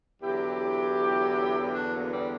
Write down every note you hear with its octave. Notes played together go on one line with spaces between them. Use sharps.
E2 D3 F#3 E4 G4
D4 F#4
F#3 A#3
G3 B3